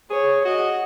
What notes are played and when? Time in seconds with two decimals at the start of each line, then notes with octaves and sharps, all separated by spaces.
0.10 G#4 C#5
0.45 F#4 D#5